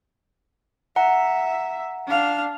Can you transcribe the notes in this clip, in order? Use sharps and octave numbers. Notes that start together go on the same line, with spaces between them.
E5 F#5 A#5
D4 F5